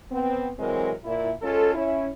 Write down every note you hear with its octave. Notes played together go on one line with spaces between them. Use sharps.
B3 C4
C3 E3 F#3 G#3 C4 A#4
A#2 E4
G#3 C#4 F4 A4
C#4 E4